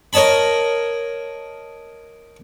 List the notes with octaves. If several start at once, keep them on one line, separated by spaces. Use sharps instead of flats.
A#4 C#5 D#5 A5 B5